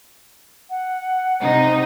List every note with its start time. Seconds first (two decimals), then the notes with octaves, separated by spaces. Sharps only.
0.70 F#5
1.42 C3 D#4